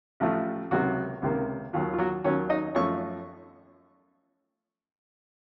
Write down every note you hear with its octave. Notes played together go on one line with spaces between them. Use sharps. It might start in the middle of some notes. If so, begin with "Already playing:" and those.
A1 A2 F3 A3
C#2 C3 D#3 F#3 A#3 F#4
C#2 C3 D#3 A#3
D#2 D#3 F#3 F4
F4
F#3 F#4
D#2 D#3 F#3 C#4 C#5
D#4 D#5
F#2 F3 A3 C#5 C#6